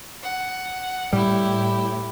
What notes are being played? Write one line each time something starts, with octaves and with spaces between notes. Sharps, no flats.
F#5
A2 G3 E4 G4